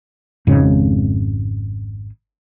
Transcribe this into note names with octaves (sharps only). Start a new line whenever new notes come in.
G#1 F2 G#2 C#3